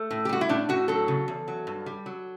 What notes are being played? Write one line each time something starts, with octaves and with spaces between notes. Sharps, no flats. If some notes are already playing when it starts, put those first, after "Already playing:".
Already playing: A3
A2
G4
G3 F#4
E4
A2 D4
A2 F#4
F#3 A4
C#3
E2
F#3
G2
G3
F#3